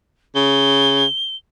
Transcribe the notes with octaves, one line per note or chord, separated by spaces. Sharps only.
C#3 G7